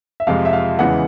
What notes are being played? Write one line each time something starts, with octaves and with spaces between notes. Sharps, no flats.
E5
F2 C3 F3 G#3 F5
E5
F5
E2 C#3 E3 G#3 B3 F#5